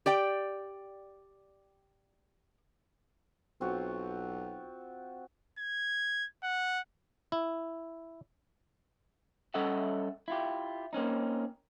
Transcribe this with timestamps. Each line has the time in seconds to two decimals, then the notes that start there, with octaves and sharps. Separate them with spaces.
0.06 G4 D5 G5
3.61 B1 C4 F4 F#4
5.59 G#6
6.43 F#5
7.32 E4
9.54 G3 C#4 A4 D#5 E5 F#5
10.28 E4 F4 G4
10.93 A#3 C4 C#4 D#4